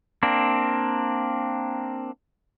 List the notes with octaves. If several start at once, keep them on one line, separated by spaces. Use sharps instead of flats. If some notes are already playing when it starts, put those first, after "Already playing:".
A#3 C4 D4